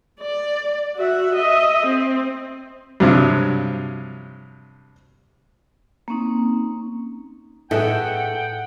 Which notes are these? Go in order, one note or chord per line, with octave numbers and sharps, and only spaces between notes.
D5
F#4 E5
D#5 E5
C4
G2 C3 F3 F#3
A#3 C4 C#4 D#4
A2 B3 D#4 E4 G#4 A4 F#5 G5